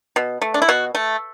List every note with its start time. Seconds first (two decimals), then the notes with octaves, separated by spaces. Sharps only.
0.16 B2
0.41 A3
0.54 D4
0.62 E4
0.68 B2 F#4
0.95 A3